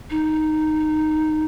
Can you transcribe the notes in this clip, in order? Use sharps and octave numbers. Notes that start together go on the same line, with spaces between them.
D#4